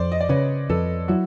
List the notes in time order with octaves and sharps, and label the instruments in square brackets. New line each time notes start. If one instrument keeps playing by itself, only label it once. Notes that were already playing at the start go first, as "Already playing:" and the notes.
Already playing: [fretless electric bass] F2 [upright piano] C5 D5
[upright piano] D#5
D5
[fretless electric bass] C#3 [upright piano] B4 C#5
[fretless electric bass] F2 [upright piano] A4 B4
[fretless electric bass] F#3 [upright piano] E4 F#4